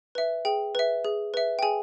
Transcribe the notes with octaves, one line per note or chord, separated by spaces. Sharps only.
B4 E5
G#4 G5
B4 E5
G#4
B4 E5
G5
G#4 G#5